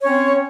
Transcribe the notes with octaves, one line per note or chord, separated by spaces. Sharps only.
C4 C#4 C#5